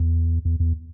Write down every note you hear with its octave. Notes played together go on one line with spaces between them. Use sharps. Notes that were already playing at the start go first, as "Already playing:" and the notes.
Already playing: E2
E2
E2